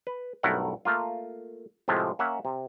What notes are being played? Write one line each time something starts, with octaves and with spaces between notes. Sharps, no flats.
B4
B1 G2 A3 E4 A#4 F#5
A3 A#3 F4
A2 C3 F3 G#3 A3
A#3 C#4 E5 F#5
C3